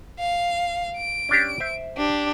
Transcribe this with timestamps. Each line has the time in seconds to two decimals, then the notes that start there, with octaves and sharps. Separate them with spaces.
0.19 F5
0.97 D7
1.29 C#4 D4 G4
1.60 C5 E5
1.97 D4 G4